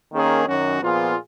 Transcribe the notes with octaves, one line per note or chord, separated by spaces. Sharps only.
D#3 A#3 C#4 G#4
F#2 D#3 F#3 C#4 F#4
A#2 F3 B3 F4 G#4